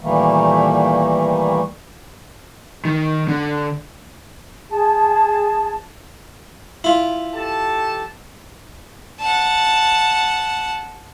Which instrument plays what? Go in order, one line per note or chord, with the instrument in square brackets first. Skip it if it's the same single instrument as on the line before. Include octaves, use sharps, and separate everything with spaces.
[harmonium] A#2 D#3 E3 G3 A3 A#3
[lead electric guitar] D#3
D3
[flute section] G#4 A5
[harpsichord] E4 F4
[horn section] G4 A4 A5
[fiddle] F#5 A5